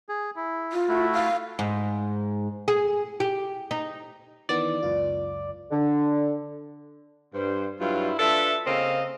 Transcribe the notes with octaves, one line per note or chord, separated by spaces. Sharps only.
G#4
E4
F4
A3 E4 F#4
F5
G#2
G#4
G4
D#4
D#3 E3 B3 D5
C#2 F#2 F4
D3
G2 C5
G2 F#3 E4 F4
D4 F4 A4 B4 E5
C#3 A#3 C4 A#4 D#5 F5